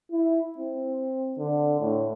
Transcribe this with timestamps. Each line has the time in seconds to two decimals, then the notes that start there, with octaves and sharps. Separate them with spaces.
0.12 E4
0.58 C4
1.39 D3
1.80 A2